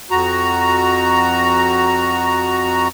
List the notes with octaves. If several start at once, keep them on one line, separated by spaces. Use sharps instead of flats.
F2 F#4 A#5